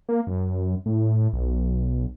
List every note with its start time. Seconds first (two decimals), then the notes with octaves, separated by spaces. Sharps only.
0.09 A#3
0.27 F#2
0.86 A2
1.33 B1